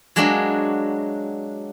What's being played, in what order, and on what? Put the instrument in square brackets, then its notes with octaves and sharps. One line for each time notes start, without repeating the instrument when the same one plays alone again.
[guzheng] F#3 G#3 A#3 D4 F#4